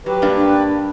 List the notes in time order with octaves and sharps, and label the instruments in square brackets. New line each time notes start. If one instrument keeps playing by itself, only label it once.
[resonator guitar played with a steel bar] F#3 [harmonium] G4 B4
[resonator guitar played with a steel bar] G2 A#3 D4